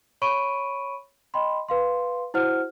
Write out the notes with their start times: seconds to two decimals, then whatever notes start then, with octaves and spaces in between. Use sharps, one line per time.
0.22 C#5 B5 C#6 D7 D#7
1.34 D#5 G5 B5 C6
1.69 B4 F5 C6
2.34 E4 F#4 C5 F#5 F6